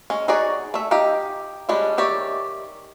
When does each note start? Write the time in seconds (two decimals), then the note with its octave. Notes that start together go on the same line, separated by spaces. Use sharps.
0.10 G#3 C#4
0.28 D#4 F#4 G#4 C#5 D5
0.74 A3 E5
0.91 D#4 G4 F5 G5
1.69 G3 G#3 C#4 D4
1.98 D#3 G4 C#5 D5 E5